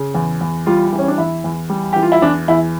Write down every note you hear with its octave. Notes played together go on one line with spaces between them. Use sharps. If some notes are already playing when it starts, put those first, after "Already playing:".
Already playing: C#3
E2
E2
G3 F4
E3
C#4
D4
E2 E4
E2
G3
E3 G4
F4
E4
E2 D4
E2 E4